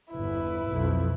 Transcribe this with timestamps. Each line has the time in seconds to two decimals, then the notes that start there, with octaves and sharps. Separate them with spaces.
0.13 G1 E2 E4 B4
0.70 B1 F2